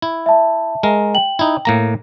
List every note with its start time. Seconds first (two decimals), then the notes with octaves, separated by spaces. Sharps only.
0.02 E4
0.26 E5 A5
0.83 G#3 A#4
1.14 G5 F#7
1.39 D#4 E4
1.65 A2 A#3 A#5